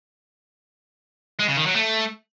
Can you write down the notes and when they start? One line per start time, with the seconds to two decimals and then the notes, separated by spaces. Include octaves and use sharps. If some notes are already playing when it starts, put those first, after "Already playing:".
1.40 G#3
1.49 C#3
1.58 D#3
1.66 F#3
1.75 A3